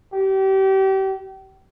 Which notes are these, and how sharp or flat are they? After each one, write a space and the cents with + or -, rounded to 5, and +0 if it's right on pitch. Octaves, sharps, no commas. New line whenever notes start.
G4 -30